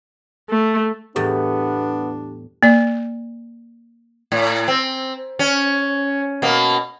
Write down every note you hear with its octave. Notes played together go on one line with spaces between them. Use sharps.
A3
E2 A2 G3 B3 D4 G4
A#3 D5
A2
C4
C#4
B2 A#3